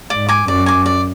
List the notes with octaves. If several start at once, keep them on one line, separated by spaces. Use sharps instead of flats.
G#2 D5
G#5 D6
F#2 D5
G#5 D6
D5